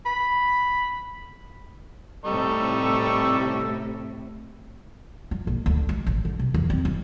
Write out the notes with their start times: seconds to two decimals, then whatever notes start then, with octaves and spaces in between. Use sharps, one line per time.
0.06 B5
2.25 A2 C3 G3 D#4 A4 C#6
5.31 F3
5.47 A#1
5.66 D2
5.89 G#3
6.06 A1
6.25 D3
6.39 C3
6.54 E2
6.70 C4
6.85 E3